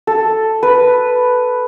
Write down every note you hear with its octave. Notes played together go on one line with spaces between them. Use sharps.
A4
B4